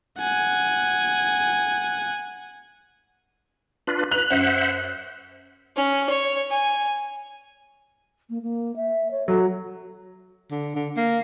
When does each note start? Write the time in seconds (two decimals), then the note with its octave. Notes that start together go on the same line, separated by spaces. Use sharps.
0.19 F#5 G#5
3.87 D4 F4 B4
4.11 B4 F#6 F7
4.30 F#2 C5 E5 F#5
5.77 C#4
6.09 C#5
6.50 G#5
8.30 A#3
8.43 A#3
8.76 E5
9.11 C#5
9.28 F#3 A4
10.51 D3
10.76 D3
10.97 A#3